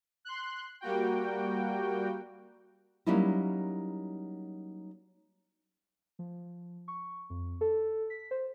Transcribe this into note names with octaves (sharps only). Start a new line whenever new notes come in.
C6 F#6
G3 A#3 F#4 G5
F#3 G3 A#3 C#4 D#4 E4
F3
C#6
F2
A4
B6
C5